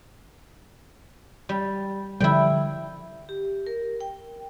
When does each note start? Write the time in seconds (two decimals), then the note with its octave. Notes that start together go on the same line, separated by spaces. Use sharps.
1.49 G3
2.20 D3 F3 G3 E4 G5
3.29 G4
3.67 A#4
4.01 G5